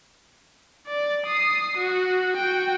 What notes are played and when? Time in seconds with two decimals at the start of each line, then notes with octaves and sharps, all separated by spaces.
0.87 D5
1.26 D#6 C7
1.77 F#4
2.37 F#4 G5